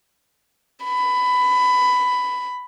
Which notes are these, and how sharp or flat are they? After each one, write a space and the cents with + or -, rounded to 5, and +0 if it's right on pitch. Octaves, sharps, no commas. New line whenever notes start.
B5 +15